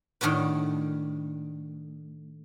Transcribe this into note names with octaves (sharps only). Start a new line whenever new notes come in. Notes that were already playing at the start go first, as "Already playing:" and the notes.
A2 D#3 D4 F#4 B4